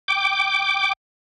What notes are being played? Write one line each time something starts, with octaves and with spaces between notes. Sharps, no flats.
G5 D6